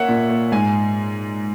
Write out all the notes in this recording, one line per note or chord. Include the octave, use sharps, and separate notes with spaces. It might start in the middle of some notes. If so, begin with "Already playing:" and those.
Already playing: A#3 C#5 E5 F#5
A#2
A#3
G#2 G#5